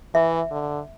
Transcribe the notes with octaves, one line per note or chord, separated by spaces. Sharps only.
E3 E5
D3